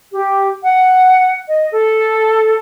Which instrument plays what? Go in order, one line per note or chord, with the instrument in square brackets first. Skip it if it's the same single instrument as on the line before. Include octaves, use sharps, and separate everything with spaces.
[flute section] G4
F#5
D#5
A4